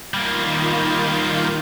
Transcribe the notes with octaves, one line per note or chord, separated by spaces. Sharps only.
D#3 G3 A#3 F4 G6